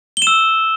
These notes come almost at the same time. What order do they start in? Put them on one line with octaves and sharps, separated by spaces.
G7 E7 E6